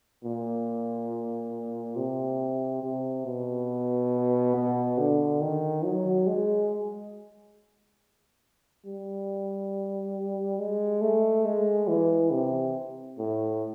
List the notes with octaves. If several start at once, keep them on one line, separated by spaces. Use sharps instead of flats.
A#2
C3
C3
B2
B2
D3
D#3
F#3
G#3
G3
G#3
A3
G#3
E3
C3
A2